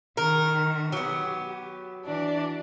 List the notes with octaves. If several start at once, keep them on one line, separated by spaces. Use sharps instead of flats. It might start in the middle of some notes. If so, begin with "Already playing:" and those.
D#3 A#4
F#3 B3 G4
E3 D4 D5